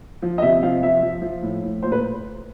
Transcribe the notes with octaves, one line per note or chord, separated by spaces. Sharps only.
F3
D#5
C3 E5
F3 F5
F3 E5
F3
F3
A2
A2
A#2 C5
B4